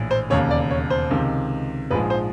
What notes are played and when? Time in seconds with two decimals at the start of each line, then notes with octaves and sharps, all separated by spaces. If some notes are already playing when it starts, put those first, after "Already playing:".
Already playing: A#1 A2 E3
0.11 C5
0.30 E1 D#2 C#3 C#5
0.51 D5
0.71 C#5
0.90 C5
1.11 C#2 C3 D#3
1.91 A#1 G#2 F3 G#3 B4
2.10 C5